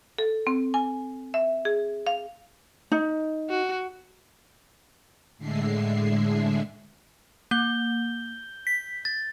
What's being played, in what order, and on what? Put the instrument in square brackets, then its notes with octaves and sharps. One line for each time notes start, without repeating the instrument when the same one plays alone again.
[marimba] A4
C4
G#5
E5
G#4
F5
[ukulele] D#4
[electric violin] F#4
[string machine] A2 D3 G#3 E5 C7
[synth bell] A#3 [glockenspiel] G6 G7
[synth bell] B6
[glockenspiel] A6